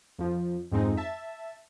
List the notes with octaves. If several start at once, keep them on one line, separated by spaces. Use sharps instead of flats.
F2 F3
F2 G#2 G#3 C4 D#4
E5 A5